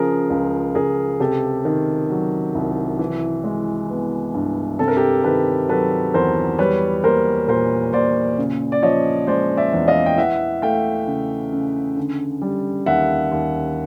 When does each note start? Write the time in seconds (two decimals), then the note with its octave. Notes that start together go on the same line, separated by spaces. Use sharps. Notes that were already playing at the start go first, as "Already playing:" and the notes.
Already playing: C#3 F3 G#4 A#4
0.30 C#2
0.75 C#2 G#4 A#4
1.20 C3 G4 A4
1.65 D#3
2.10 F#3
2.55 C2
2.99 E3
3.44 G#3
3.90 B3
4.34 G2
4.79 C3 A4
4.88 A#4
4.97 G4 A4
5.24 D#3 A4 B4
5.69 F#3 A4 B4
6.14 E2 A#4 C5
6.59 G3 B4 C#5
7.04 A#3 A#4 C5
7.48 A#2 A#4 C5
7.93 A#2 C5 D5
8.38 C#3
8.72 D5
8.82 F3 C#5 D#5
9.27 G#3 C5 D5
9.57 D5 E5
9.73 E2
9.88 D#5 F5
10.06 G5
10.18 E3 E5 F#5
10.62 A3 F5 G5
11.07 C#3
11.53 C#3
11.97 D3
12.42 G3
12.86 D#2 E5 F#5
13.32 D#2